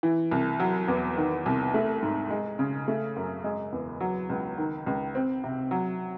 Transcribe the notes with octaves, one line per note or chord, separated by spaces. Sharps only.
E3
C2
F#3
E2
D#3
C2
A3
G#2
G#3
C#3
A3
F#2
G#3
E2
F#3
C#2
D#3
C#2
C4
C3
F#3